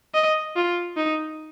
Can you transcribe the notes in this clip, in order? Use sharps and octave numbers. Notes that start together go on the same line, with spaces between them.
D#5
F4
D#4